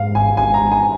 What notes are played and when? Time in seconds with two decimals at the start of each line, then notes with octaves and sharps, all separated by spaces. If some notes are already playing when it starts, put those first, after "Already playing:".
Already playing: G#2 F5
0.15 G#1 G#5
0.37 G#1 G#5
0.54 A#5
0.60 G#1
0.72 G#5